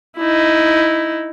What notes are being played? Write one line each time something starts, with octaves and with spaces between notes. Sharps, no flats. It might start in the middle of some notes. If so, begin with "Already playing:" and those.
D#4 E4